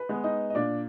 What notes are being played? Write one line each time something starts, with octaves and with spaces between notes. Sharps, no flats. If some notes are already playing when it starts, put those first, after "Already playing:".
Already playing: B4
G#3 B3
D#4 D#5
D#5
A#2 D4 D5